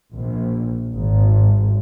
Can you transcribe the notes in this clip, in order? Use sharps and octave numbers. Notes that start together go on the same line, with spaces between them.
A#1
G#1